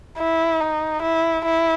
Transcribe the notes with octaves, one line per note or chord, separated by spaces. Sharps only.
E4
D#4
E4
E4